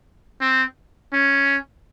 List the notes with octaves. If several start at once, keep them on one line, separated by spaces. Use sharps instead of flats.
C4
C#4